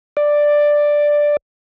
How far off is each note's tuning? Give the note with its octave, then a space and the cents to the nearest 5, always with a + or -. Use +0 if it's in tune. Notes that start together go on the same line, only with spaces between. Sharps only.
D5 +5